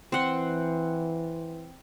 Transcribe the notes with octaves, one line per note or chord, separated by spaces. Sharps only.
E3 C4 F#5 C6